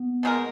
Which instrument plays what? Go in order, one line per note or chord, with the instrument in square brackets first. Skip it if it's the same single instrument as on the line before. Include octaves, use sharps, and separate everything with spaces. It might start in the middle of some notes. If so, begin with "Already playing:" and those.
Already playing: [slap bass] B3
[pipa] B2 G#3 D#4 A#4